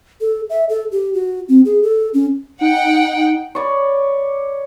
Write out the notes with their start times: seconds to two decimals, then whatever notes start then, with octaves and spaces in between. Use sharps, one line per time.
0.21 A4
0.50 E5
0.69 A4
0.92 G4
1.14 F#4
1.49 C4
1.65 G#4
1.83 A4
2.14 C#4
2.61 D#4 F#5 G5
3.55 C#5 D5 B5